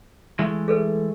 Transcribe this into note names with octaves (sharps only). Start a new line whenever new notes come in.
E3 G#3 A3
G#4 A4 B4